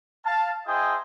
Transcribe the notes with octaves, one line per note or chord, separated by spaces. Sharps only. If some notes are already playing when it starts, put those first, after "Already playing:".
F5 A5
E4 G#4 C5 D#5 G5